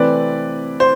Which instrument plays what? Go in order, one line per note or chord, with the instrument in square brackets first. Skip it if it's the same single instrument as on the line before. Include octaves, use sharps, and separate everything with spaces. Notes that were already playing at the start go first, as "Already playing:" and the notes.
Already playing: [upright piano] C3 E3 A3 C4 [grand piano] B4 D5
[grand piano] C5